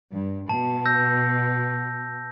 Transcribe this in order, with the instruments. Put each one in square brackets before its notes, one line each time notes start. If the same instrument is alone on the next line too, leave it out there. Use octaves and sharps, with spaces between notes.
[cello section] G2
[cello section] B2 [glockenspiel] A5
[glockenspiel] E6 G6 A#6